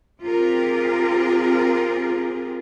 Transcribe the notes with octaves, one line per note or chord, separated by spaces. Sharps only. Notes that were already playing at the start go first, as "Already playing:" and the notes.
C4 F4 G4 G#4 A#4